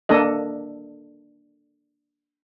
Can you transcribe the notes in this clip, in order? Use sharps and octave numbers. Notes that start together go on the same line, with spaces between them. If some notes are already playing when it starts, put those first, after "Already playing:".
A#3 D4 A4 D#5